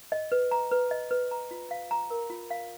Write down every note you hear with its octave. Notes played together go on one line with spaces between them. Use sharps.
D#5
B4
A#5
B4
D#5
B4
A#5
F4
F5
A#5
A#4
F4
F5